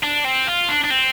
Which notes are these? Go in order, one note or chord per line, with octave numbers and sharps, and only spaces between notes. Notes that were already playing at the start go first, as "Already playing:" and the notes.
D4
C4
F4
D4
D4
C4